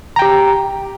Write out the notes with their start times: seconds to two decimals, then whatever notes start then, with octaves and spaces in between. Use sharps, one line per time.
0.16 A#5
0.19 G5
0.22 G4